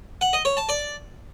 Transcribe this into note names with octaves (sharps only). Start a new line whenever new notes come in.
F#5
D#5
C#5
A5
D5